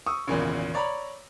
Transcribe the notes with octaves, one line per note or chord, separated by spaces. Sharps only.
C#6 D#6 E6
G#1 E2 A#2 C#3
C#5 D5 A#5 B5